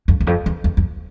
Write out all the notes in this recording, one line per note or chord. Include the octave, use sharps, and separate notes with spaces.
F2
E2
F2
E2
E2
F2